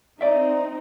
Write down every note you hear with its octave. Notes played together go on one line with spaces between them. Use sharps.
C4 D#4 D5 E5